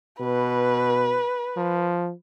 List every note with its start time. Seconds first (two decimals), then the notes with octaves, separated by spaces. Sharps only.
0.20 B2 B4
1.57 F3